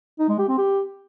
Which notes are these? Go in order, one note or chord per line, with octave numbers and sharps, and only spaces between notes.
D#4
G#3
G4
C4
G4